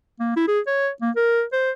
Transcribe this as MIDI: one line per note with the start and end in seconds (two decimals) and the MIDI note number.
0.20 0.35 58
0.36 0.44 64
0.48 0.60 68
0.67 0.90 73
1.01 1.10 58
1.16 1.43 70
1.52 1.71 72